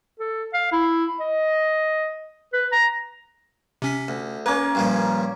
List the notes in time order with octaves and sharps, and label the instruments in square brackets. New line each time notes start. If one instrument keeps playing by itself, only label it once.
[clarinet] A4
F5
E4
D#5
B4
A#5
[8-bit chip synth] C3 C#4 B6
[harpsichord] D2
[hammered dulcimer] A#3 C#4 [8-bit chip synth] B4 D6
[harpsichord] G2 A#2 F3